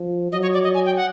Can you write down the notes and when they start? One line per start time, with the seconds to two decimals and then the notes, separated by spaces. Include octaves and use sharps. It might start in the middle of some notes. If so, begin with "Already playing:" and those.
Already playing: F3
0.32 F#3 D#5
0.42 C#5
0.53 D5
0.63 D#5
0.74 G#5
0.85 G5
0.96 F#5